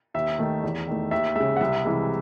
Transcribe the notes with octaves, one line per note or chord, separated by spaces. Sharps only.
D#2 E5
D#3 A3
E2
D#3 A3
D#2 E5
C#3 G#3 E5
F#5
C2 E5
C3 E3 G#3